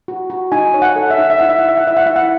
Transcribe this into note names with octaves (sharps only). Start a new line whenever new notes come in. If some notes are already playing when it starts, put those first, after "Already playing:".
F#4
F#4
D#4 G#5
C#5
F#5
A4
E5
D#4 F#5
E5
E4 F#5
E5
E4 F#5
E5
F#5
E4 E5
F#5
E4 E5
F#5